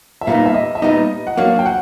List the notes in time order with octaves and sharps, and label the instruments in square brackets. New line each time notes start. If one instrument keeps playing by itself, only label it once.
[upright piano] E5
[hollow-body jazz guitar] A#2 G3 B3 D#4 [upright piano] F5
[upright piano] E5
D#5
E5
[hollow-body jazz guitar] A#2 G3 B3 D#4 [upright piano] D#5
[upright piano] F#5
[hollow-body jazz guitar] F#3 A#3 D4 F#4 [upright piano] F5
[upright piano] G5
F#5